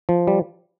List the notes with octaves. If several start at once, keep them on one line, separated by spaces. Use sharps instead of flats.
F3
G3